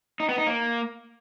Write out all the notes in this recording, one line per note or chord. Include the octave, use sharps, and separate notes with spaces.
D#4
B3
D#4
A#3